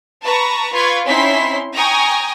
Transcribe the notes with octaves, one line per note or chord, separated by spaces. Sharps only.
B4 A5 A#5 C#6
F4 B4 C#6 G#6
C4 C#4 D#4 E4 C6 B6
G5 G#5 A#5 C#6 D#6